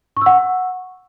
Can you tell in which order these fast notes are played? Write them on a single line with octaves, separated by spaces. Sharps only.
C#6 E6 F#5